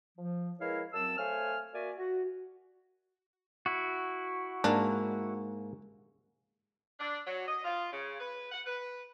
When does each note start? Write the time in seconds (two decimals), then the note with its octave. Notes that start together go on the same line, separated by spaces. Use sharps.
0.18 F3
0.60 G#3 E4 A#4 B4 C#5 F5
0.93 F#2 F#3 C4 A5 E6
1.17 A3 C5 C#5 F5 G#5 F6
1.73 A#3 F#4 D5 E5 G#5
1.97 F#4
3.66 E4 F#4
4.64 G#2 A#3 D4 A#5
7.00 D4
7.27 F#3
7.48 D#5
7.64 F4
7.93 C#3
8.20 B4
8.52 F#5
8.66 B4